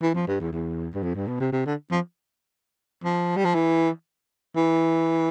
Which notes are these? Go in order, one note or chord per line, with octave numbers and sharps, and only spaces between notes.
E3
F3
G2
E2
E2
G2
F2
G2
B2
C3
C3
D3
F3
F3
G3
F3
E3
E3